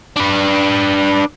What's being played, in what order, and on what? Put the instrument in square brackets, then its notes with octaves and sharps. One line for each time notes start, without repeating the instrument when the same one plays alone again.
[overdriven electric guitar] D4 B4